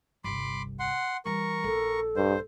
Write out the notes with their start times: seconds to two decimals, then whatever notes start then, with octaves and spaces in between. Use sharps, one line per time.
0.24 G1 C2 B5 C6 D6
0.79 F#5 C6
1.25 E3 G3 A#4 C#6
1.64 A#1 A4
2.16 G2 C5